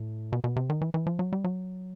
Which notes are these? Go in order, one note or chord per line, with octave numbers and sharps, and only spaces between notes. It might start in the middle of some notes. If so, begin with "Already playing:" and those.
Already playing: A2
B2
B2
C3
D#3
E3
E3
F3
F#3
G3
F#3